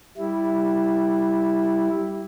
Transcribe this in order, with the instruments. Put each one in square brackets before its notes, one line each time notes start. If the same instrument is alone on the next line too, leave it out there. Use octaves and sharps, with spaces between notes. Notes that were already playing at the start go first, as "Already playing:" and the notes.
[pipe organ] G3 E4